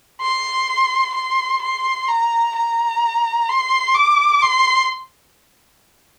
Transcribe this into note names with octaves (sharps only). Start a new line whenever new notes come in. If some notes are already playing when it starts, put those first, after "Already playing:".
C6
C6
C6
A#5
A#5
C6
D6
C6